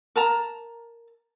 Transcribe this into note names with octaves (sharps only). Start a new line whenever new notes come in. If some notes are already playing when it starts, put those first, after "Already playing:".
A#4 A5 A#5